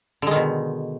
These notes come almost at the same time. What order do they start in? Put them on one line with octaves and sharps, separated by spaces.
D3 G#3 D#3 B2